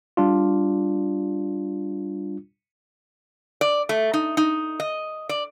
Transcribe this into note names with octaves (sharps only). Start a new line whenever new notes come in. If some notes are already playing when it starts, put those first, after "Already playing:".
G3 D4 F4
D5
A3
D#4
D#4
D#5
D5